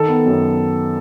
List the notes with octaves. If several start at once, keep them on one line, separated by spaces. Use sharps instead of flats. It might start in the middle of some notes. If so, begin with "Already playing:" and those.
Already playing: D#3 A4
B3
F#2